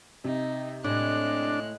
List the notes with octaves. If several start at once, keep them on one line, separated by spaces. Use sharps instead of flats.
C3 D#4
A2 G#3 D4 F#6